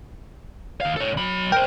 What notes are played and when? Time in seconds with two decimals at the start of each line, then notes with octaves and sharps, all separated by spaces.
0.81 D#2 F5
0.96 A4 C#5
1.17 F#3 B5
1.52 A#4 C5 G5